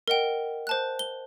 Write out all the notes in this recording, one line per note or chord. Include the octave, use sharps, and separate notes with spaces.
A#4 D#5 F#5 G5
C5 A5 F#6
G7